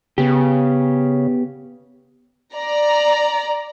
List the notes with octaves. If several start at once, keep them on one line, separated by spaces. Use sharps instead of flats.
C#3 B3 G4
D5 A#5